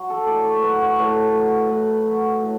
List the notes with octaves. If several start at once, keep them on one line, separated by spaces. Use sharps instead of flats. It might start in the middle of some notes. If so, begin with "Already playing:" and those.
Already playing: F#3 F#4
A4
A2 D5
C#5
F#3 B4
C#5
A2 B4
F#3
A2 B4
F#3
A2